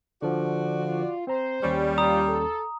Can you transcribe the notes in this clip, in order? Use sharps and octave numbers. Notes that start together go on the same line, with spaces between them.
D3 F3 F#4 D5
F4
C4 C5 A#5
D#2 G3 C#4 C#6
F4 A#5 D#6
A4